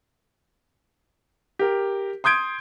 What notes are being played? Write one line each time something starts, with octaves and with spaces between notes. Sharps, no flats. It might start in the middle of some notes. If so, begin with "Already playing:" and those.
G4 A#4
C6 D#6 G6 G#6 D7